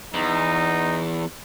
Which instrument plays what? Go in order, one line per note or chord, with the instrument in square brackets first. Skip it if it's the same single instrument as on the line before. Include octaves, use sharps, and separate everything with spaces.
[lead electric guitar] E2 [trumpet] D#4